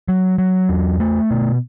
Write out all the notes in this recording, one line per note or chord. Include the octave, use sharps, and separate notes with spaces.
F#3
F#3
E2
A3
B2